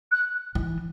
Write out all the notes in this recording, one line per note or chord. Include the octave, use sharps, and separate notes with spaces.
F#6
E3